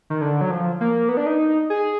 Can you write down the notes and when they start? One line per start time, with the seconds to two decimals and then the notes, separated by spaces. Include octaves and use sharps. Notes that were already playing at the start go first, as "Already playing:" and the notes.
0.10 D#3
0.21 D3
0.41 F#3
0.51 F3
0.81 A#3
1.09 B3
1.17 D4
1.26 D#4
1.70 G#4